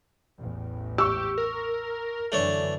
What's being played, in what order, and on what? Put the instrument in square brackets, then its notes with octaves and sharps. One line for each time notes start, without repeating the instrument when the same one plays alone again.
[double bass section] A1 E2 A2
[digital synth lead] G4 [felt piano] C#6 E6
[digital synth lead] A#4
[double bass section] F#2 D3 E3 [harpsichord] A3 D4 C#5